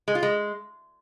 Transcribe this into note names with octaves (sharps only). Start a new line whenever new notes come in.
G#3
F4
G#3